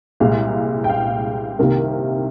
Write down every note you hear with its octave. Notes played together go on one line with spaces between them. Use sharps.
C2 A#2 G#3 F5
G5
F5
C2 C3 D#3 A#3 A#4